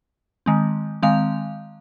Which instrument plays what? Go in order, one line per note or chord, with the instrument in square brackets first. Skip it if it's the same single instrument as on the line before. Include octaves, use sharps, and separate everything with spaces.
[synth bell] D#3 G#3 C4
D#3 G#3 C4 F5